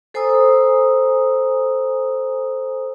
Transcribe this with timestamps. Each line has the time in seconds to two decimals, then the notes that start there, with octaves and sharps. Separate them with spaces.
0.14 A4 C5 G#5 A#5 D#6 E6